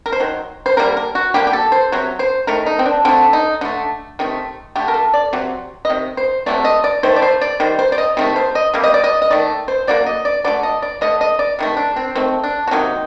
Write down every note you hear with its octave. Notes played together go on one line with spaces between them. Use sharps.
A#4
C5
D#3 F#3
C5
D3 G3 A#3 A#4
A#4
F#4
D3 G3 A#3 G4
G4
A4
C5
C3 F#3
C5
D#3 A3 A#4
D#4
C4
D4
D3 A3 C4
D#4
D3 A3
C3 D#3 A3
D3 A3 G4
A#4
A4
D5
C3 F#3
D#5
C3 D#3
C5
C3 F#3 A3 D5
D#5
D5
D#3 A3 C5
D5
C5
D5
D#3 G3 C5
C5
D5
D#5
C3 D#3 A3
C5
D#5
C3 G3 A#3
D#5
D5
D#5
D#5
D#3 A3 D5
C5
D3 F#3 A#3 D5
D#5
D5
D3 F#3 A3 D5
D#5
D5
D3 A3 D#5
D#5
D5
C3 D#3 A3
D4
C4
D#3 A3 C4
D4
F#4
C3 D#3 F#3 A#3 D#4